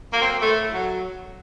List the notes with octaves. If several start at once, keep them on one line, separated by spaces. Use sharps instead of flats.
F#3 A#3
C4
A#3
A2 A3
F#3